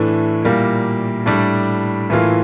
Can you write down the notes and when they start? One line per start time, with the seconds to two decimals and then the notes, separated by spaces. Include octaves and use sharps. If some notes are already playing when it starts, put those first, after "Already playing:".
Already playing: A2 E3 A3 D4
0.43 A#2 G3 A#3 E4
1.26 A2 G3 D4
2.10 A2 E3 A#3 F4